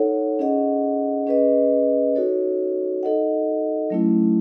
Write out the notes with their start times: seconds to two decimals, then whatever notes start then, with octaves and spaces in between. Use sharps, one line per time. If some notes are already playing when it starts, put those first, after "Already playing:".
Already playing: D#4 A4 C#5 F#5
0.39 C#4 G#4 D#5 F#5
1.27 C#4 G#4 B4 D#5
2.15 D#4 F#4 A4 C#5
3.03 D#4 A4 D#5 F#5
3.90 F#3 A3 C#4 E4